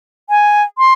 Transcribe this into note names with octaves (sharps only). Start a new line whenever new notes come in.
G#5
C6